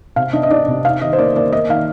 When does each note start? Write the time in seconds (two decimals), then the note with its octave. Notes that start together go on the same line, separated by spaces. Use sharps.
0.16 C3 F5
0.33 D4 D#5
0.43 D#5
0.51 D4 D5
0.68 C3
0.84 D#4 F5
1.02 D#3 D#5
1.13 C5
1.19 A#3 D5
1.36 A#3 D5
1.52 A#3 D#5
1.69 D#3 F5